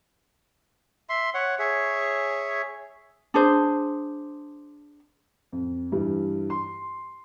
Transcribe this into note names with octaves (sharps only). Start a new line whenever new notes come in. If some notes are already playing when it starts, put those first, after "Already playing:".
E5 C6
C#5 F#5
G#4 C#5 E5
D4 G#4 C5
F2
G2 E3 G3
C6